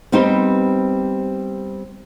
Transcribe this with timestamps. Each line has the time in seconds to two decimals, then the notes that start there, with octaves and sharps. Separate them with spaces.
0.12 G3 B3 C4 D#4 G4 C5